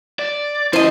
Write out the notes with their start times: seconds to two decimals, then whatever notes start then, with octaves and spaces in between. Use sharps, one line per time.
0.19 D5
0.73 F3 C#4 E4 C5 D#5